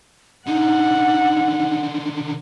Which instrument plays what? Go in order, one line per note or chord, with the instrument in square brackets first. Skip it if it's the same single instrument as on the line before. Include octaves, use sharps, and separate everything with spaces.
[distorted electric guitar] D3 D#3 [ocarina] D#4 [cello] F#5